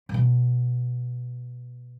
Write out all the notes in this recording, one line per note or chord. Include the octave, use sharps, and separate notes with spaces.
A#2
B2